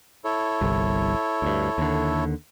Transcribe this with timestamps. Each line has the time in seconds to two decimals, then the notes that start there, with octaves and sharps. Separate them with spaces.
0.24 E4 A4 C#5
0.61 G1 C2
1.42 D2 G2
1.78 D#2 D3